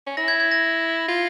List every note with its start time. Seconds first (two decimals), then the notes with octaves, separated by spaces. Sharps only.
0.07 C#4
0.17 E4 A#6
0.28 G#6
0.40 G#6
0.51 A#6
1.08 F4